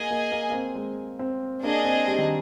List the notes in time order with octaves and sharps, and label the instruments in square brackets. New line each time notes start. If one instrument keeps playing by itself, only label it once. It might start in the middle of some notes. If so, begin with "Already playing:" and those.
Already playing: [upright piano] A#3 [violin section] G#4 D#5 G#5
[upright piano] A#3
A#3
A#3
C4
G#3
C4
[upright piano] A#3 [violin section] D4 G#4 D#5
[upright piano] C4
G3
D#3